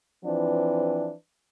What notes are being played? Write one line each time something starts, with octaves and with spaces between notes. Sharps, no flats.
E3 F3 C4 D4 B4